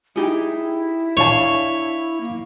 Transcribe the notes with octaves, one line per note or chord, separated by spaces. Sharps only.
D#4 E4 G4 G#4
D4 C#5 F5 A5
A#3